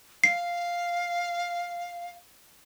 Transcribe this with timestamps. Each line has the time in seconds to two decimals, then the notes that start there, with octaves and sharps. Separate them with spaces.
0.24 F5 C7